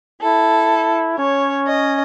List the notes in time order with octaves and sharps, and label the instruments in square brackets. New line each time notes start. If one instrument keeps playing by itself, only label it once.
[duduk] E4 [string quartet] A4
[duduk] C#4 [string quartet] C#5
[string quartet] D#5